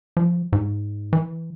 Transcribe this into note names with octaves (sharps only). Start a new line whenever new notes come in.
F3
G#2
E3